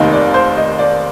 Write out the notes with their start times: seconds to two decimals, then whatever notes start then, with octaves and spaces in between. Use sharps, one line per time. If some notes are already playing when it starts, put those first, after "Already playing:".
Already playing: F1 D#2 D#3 D#5
0.12 D5
0.34 C5
0.57 D#5
0.79 D5